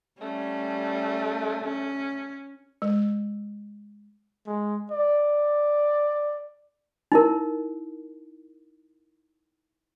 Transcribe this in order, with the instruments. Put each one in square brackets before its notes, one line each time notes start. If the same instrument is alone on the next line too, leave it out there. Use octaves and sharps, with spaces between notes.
[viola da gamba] G3 C#4 [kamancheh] A3
[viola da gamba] C#4
[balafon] G#3
[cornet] G#3
D5
[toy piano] D#4 E4 A#4